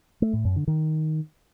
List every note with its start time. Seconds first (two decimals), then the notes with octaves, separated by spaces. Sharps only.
0.22 A3
0.33 A2
0.45 F#2
0.56 D3
0.68 D#3